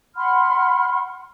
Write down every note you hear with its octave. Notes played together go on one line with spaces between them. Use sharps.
F#5 B5 C6 F6